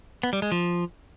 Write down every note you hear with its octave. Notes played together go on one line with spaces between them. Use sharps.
B3
G3
G#3
F3